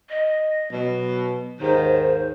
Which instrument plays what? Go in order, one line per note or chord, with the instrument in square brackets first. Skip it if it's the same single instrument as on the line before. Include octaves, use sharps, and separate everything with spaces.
[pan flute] D#5
[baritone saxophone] B2 [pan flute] F#3
[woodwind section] D#2 G#2 [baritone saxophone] D#3 [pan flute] C5